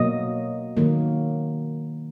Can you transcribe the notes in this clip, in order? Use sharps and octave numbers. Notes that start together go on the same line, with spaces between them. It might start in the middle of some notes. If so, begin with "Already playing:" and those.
Already playing: B2 F#3 A#3 D#5
D#3 F#3 A#3